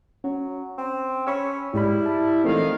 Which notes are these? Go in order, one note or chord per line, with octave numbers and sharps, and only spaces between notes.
F#3 C#4
C4
C#4 B5 C#6 E6
G#2 G3 G#3 E4 B5
A5
A#1 D#3 E3 A3 C4 F5